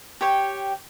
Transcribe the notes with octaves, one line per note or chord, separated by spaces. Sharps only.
G4 C#5 G5